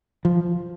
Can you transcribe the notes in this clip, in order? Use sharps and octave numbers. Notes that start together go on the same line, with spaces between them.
F3